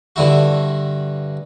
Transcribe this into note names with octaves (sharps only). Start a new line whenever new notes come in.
G2 D3 E4 F#4